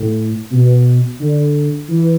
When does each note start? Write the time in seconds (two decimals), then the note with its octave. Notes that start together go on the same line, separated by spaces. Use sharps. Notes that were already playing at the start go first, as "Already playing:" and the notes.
Already playing: A2
0.51 B2
1.20 D3
1.88 E3